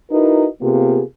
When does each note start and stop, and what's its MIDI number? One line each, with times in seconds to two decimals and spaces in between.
0.10 0.45 63
0.10 0.45 64
0.10 0.45 66
0.10 0.45 70
0.10 0.45 71
0.10 0.45 75
0.61 1.01 48
0.61 1.01 58
0.61 1.01 59
0.61 1.01 65
0.61 1.01 67
0.61 1.01 68